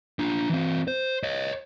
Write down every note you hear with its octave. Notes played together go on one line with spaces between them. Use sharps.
D4 F4
E3 C4
C5
C#5 D#5